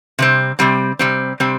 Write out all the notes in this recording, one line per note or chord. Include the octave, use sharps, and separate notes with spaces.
C3 G3 C4
C3 G3 C4
C3 G3 C4
C3 G3 C4